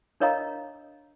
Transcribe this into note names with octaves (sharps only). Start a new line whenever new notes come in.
D4 A#4 C#5 D#5 F5 A#5